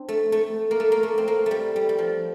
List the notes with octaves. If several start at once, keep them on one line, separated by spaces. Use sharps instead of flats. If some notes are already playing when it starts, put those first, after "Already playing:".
Already playing: C4 D4
A3
A3
A#3
A3
A#3
A3
C4
A#3
G3 A3
G3
G3
F3